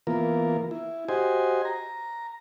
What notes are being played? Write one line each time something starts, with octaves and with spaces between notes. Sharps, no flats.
E3 A#3 B3 F4 A#4
E4
F#4 G4 C5 D#5 G#5
A#5